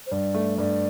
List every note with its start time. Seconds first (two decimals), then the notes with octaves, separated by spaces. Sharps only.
0.07 C5
0.11 G2 D5
0.34 A3
0.58 G2 D5